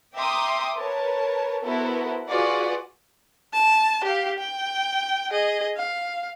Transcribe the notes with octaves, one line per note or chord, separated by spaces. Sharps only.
E5 G5 A#5 C6 D6 D#6
A#4 B4 C#5 A5
B3 E4 F#4 A4 A#4 C5
F4 F#4 G#4 B4 D5 F#5
A5
G4 F5
G5
G#4 D#5
F5